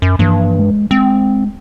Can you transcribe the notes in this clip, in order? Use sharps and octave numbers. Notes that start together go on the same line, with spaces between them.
F#2
G2 E3 F3 A#3
G#3
G#3 C4